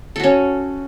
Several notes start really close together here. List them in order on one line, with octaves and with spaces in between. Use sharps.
A4 F#4 C#4